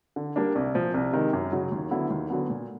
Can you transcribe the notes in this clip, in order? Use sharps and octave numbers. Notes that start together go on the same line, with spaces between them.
D3
G3 A#3 D4
C2
A#2 F3
C2
C3 D#3 G#3
F#2
C#3 F#3
D#2
D3 F#3 B3 E4
D#2
D3 F#3 B3
A#2